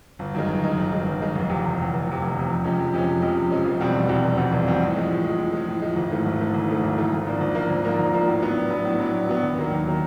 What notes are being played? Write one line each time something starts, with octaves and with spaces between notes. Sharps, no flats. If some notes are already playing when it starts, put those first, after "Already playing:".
G1
F#2 D#3 G#3
G1
F#2 D#3 G#3
G1
F#2 D#3 G#3
G1
F#2 D#3 G#3
F1
E2 C3
F1
E2 C3
F1
E2 C3
F1
E2 C3
F2
C3 F3 G#3 C#4
F2
C3 F3 G#3 C#4
F2
C3 F3 G#3 C#4
F2
C3 F3 G#3 C#4
F1
E2 B2 G3 C4
F1
E2 B2 G3 C4
F1
E2 B2 G3 C4
F1
E2 B2 G3 C4
A2
F3 G#3
A2
F3 G#3
A2
F3 G#3
A2
F3 G#3
G#1
G#2 E3 A3
G#1
G#2 E3 A3
G#1
G#2 E3 A3
G#1
G#2 E3 A3
G#1
G#2 F3 A#3 D4
G#1
G#2 F3 A#3 D4
G#1
G#2 F3 A#3 D4
G#1
G#2 F3 A#3 D4
A2
F#3 B3 D4
A2
F#3 B3 D4
A2
F#3 B3 D4
A2
F#3 B3 D4
D#2
D#3 F#3 A#3
D#2
D#3 F#3 A#3